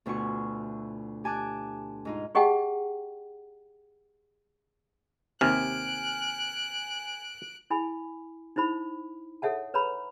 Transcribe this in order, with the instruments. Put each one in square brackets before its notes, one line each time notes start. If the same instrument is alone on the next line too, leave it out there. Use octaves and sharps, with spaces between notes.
[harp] D2 B2 E4 F4 G#5 C#6
G4 G#5 A5 D6 F#6
G#2 D#4 F4
[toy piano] G4 G#4 D#5 F#5 G5 A5
[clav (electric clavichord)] D#2 C3 [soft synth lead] G#5 [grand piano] F6 [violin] F#6 D7
[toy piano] E4 G#5 B5
D#4 E4 C5 B5
A4 C#5 E5 F#5 A5
B4 C#5 A#5 B5